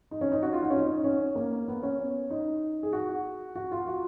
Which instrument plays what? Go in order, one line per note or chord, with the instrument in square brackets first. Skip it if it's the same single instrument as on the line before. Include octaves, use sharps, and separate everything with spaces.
[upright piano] D#4
C#4
D#4
F#4
F4
D#4
C#4
D#4
C#4
A#3
B3
C#4
D#4
G#4
F#4
F#4
F4
F#4